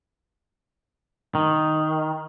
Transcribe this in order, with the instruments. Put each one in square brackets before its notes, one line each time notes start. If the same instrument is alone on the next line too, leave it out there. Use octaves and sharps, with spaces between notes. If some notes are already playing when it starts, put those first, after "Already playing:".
[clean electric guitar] D#3